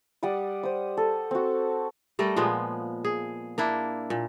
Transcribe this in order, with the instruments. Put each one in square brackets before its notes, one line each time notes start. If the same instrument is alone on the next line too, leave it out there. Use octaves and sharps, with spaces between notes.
[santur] G3 D5 F#5 D#6
C5 D#6
A4
C4 F#4
[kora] G3 A3 A4 A#4
A#2 F3 G#3 B3
G#4
A#3 D4 E4
A#2